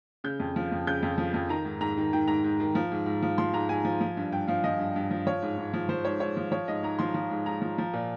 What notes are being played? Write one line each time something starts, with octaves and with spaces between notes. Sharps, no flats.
C#3 G6
F2
F3
F2
C#3 G6
F2
F3
F2
D#3 A#5
G#2
G#2 A#5
D#3
D#3 G5
G#2 A#5
G#2
D#3
F3
G#2
G#2
F3
F3 C6
G#2 A#5
G#2 G#5
F3
F3
G2
G2 G5
F3 F5
F3 D#5
G2
G2
F3
F3 C#5
G#2
G#2
F3
F3 C5
G#2 C#5
G#2 C#5
F3
F3 C#5
G#2 D#5
G#2 A#5
F3 C6
F3
G#2
G#2 A#5
F3
F3
A#2